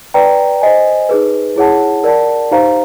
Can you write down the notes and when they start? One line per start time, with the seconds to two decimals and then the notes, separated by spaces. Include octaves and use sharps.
0.14 B4 D5 G5 A#5
0.62 C5 D#5 G#5
1.09 D#4 G#4 B4
1.56 E4 G#4 C#5 F#5 A5
2.04 A#4 D5 F#5 A5
2.51 D#4 G4 C5 F5 A#5